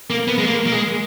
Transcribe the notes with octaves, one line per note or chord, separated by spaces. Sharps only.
A#3
B3
G#3
A#3
A#3
G#3